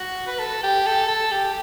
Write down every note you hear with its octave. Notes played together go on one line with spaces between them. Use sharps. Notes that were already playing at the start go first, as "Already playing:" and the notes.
Already playing: F#4
B4
A4
G4
A4
A4
G4